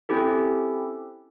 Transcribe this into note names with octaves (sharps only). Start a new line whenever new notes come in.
C4 C#4 E4 G4 A4